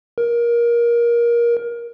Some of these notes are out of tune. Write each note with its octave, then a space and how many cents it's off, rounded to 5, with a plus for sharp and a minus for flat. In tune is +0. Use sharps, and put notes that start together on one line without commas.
A#4 +20